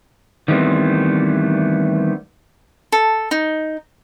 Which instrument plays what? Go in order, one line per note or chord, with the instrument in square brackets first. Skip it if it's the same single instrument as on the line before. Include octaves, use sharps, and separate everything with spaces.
[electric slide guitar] D#3 E3 G3 A3 B3 C4
[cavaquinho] A4
D#4